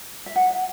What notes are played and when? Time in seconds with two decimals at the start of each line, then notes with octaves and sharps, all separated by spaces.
0.26 E5
0.36 F#5